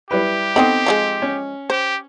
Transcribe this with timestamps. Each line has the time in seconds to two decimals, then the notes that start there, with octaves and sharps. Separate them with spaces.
0.11 G3 E4 G4 B4
0.56 B3 C4 D#4 A4 G5 B5
0.86 F3 F#3 G#3
1.22 C#4
1.70 G4 C5